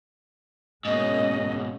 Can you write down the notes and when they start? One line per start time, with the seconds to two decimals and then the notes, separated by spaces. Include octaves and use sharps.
0.85 G#2 B2 G#3 A#3 C#4 D#5